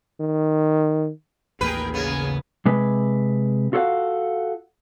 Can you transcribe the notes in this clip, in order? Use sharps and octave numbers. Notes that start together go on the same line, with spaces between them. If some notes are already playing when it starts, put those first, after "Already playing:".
D#3
A1 D#2 A#3 G#4 A#4 B4 G5
C#3 B3 G#4 A#4 G#5
C3 G#3 B4
F4 F#4 A4 C#5 F5 F#5